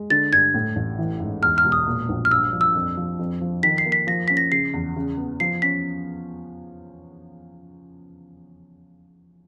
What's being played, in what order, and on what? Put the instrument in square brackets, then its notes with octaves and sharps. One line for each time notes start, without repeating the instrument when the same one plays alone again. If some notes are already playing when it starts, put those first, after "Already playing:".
Already playing: [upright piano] G#3
[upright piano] D3 [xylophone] A6
[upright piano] G2 [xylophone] G#6
[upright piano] A2
A1
E3
G#2
[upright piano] E2 [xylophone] F6
[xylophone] F6
[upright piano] E1
[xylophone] D#6
[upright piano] A#2
A#1
[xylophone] F6
[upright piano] G2 [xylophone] E6
[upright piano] F3
[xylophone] E6
[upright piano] F2
F3
F2
F3
[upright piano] D#3 [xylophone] B6
[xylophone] C7
[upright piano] A#3
[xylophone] B6
[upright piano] F3 [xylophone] A#6
[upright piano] C#4 [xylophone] B6
[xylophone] A#6
[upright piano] C#3 [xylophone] C7
[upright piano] E2
C#3
B3
[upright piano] F3 [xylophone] C7
[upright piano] C#4 [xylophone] B6